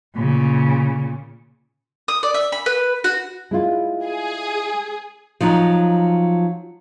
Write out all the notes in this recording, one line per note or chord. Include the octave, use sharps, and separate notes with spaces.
A#2 C#3
D#6
D5
E5
B5
B4
F#4
G#3 E4 F4
G#4
F3 F#3 D#4